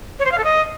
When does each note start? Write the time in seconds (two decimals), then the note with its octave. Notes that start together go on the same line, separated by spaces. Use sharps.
0.19 C#5
0.25 C5
0.32 F5
0.38 A4
0.44 D#5